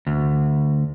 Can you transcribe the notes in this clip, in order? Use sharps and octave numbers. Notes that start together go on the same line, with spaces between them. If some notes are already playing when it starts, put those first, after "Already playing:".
D2